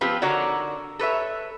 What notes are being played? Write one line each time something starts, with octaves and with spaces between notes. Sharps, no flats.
F3 B3 C4 F4 G4 B4
D3 D#4 F#4 A#4 C#5 D5
A4 B4 C#5 E5